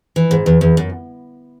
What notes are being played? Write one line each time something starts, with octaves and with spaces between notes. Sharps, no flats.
E3
G#2
E2
E2
F#2